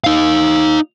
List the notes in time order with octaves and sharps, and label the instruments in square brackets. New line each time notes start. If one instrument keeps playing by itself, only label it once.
[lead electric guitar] D#4 F5